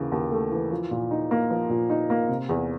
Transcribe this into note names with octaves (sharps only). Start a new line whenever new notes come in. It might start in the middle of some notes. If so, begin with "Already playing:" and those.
Already playing: D#2 C#3 E3
D#2
A3
E3
F3
A#2
D#4
A#3
F3
A#2
D#4
A#3
C3
E2